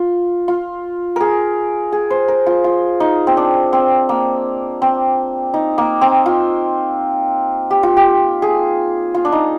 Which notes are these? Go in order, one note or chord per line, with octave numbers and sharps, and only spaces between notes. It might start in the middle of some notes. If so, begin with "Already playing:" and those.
Already playing: F4
F4
G#4 A#4
G#4
C5
A#4
F4
F4
D#4
C4
D4
C4
A#3
C4
D#4
A#3
C4
F4
G4
F4
G4
G#4
F4
D4
D#4